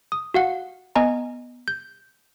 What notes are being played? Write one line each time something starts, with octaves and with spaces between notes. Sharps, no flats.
D#6
F#4 F5 F#5
B3 D#5 G#5 A#5
G6